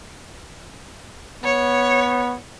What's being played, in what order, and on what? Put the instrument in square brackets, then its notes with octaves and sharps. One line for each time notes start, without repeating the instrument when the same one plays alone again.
[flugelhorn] B3 [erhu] C#5